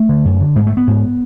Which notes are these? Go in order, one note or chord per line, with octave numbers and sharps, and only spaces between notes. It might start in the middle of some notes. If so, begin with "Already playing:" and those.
Already playing: A3
D3
F#2
D3
G#2 G#3
A3
B3
G#2